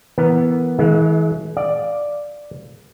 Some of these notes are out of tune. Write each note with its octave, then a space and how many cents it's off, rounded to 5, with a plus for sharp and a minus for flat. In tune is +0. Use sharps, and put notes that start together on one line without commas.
E3 +0 B3 +0 A#4 +5
E3 -35 G#3 +35 F5 -25
D5 +0 F5 +0